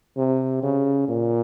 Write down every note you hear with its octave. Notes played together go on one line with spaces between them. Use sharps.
C3
C#3
A#2